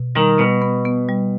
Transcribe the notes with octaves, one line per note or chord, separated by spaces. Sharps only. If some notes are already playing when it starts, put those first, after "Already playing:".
Already playing: B2
D#3 G3
B2 G3
B3
B3
G3